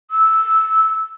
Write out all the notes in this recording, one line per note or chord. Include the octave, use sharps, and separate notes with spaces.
E6